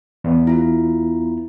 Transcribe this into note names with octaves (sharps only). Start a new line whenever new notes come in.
E2 B3
E4 F4